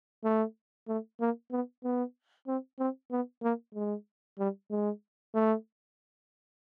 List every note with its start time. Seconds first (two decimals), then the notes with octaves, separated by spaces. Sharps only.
0.24 A3
0.88 A3
1.20 A#3
1.52 B3
1.84 B3
2.47 C4
2.79 C4
3.11 B3
3.43 A#3
3.75 G#3
4.39 G3
4.71 G#3
5.34 A3